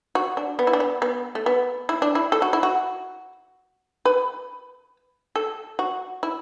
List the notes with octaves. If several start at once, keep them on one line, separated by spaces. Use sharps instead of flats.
F#4
D4
B3
E4
D4
B3
B3
A3
B3
E4
D4
E4
A4
F#4
E4
F#4
B4
A4
F#4
E4